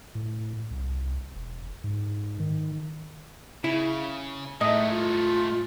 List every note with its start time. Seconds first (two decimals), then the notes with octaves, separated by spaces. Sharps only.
0.15 A2
0.71 C2
1.35 E1
1.84 G#2
2.40 D#3
3.64 C#3 E4
4.61 A2 G#3 A3 D#5 E5
4.91 F4